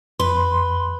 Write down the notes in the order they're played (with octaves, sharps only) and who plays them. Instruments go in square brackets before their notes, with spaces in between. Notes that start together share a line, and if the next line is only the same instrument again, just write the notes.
[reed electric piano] F2 [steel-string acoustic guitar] B4 [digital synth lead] C6